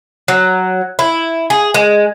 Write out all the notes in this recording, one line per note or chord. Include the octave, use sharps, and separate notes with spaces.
F#3
E4
G#4
G#3